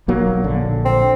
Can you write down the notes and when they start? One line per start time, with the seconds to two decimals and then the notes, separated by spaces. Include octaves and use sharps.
0.08 B1 F#3 A#3
0.44 A#1 D3
0.85 C4